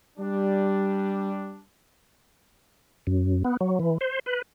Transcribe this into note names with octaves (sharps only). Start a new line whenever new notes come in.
G3 D4
F#2
B3
F#3
E3
C5
B4